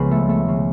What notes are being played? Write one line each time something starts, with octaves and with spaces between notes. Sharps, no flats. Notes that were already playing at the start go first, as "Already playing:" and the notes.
Already playing: C#2 C#3 F3 B3 B5
A3
A3
C#3